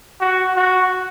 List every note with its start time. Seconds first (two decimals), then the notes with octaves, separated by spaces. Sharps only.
0.20 F#4
0.56 F#4